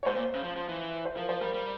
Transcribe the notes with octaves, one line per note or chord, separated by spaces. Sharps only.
C#5
G#2 C5
A#2
C#3
F3
F3
E3
C5
F3 A#4
F3 C5
G3 A#4
G3